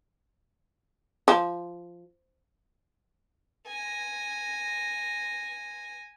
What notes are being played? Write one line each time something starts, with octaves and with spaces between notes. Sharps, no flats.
F3
G#5 A#6